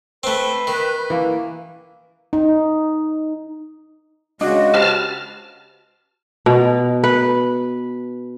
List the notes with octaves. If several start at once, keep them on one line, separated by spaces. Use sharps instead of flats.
A3 C4 B4
D#3
E3 A#3
D#4
C#3 G#3 D4 F#4 D#5
G4 B4 C5 A5 F6
B2
B4